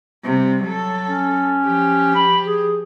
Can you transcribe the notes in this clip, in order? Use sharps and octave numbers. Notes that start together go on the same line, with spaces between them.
C3 G3
F#3 A4
C#4
F3 G4
B5
G#4